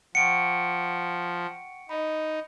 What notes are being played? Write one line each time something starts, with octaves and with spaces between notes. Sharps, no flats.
F3 F#5 G5 C#6 C#7 D7
D#4 D#5 B5